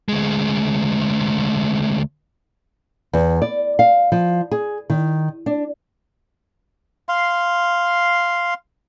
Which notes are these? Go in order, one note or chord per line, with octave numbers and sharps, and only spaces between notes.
D2 G#3
E2
D5
F5
F3
G#4
D#3
D4
F5 C6